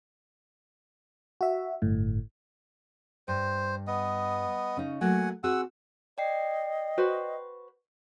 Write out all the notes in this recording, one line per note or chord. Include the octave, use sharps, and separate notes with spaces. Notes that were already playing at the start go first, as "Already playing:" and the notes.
F#4 E5
G1 A2
G2 C5
B3 D#5
C#3 C#4 D#4
F#3 A3 A#3 F#5 G#5
C4 F#4 G#4 F#5 E6
D5 D#5 G5 C7
F#4 B4 C5